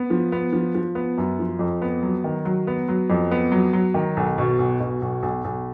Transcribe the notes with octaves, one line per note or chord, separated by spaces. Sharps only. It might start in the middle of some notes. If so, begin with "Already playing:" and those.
Already playing: B3
F3
B3
F3
F3
B3
F#2
F3
F2
B3
F#3
D#3
F#3
B3
F#3
F2
B3
F#3
F#3
D#3
B1
B2
B1
B2
B1
B1
B1